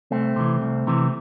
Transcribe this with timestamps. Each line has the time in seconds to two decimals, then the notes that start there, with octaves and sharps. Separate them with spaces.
0.11 C2 A3 C4
0.36 C3 E3
0.62 C2
0.87 C3 E3